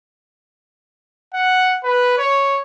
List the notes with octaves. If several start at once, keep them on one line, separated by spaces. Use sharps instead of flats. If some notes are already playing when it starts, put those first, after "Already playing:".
F#5
B4
C#5